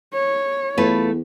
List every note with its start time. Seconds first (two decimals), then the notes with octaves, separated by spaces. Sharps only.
0.14 C#5
0.78 E2 A3 F4 B4